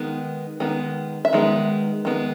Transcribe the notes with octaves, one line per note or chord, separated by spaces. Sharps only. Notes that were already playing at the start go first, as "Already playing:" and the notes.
Already playing: D#3 G#3 B3
D#3 G#3 B3
E5
D#3 G#3 B3
D#3 G#3 B3